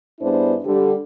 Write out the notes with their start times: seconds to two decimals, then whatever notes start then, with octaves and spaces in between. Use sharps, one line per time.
0.20 G2 B3 D4 E4 G#4 C5
0.65 D3 G3